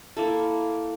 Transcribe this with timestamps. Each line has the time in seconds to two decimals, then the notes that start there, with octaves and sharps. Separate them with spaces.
0.17 A#3 E4 A4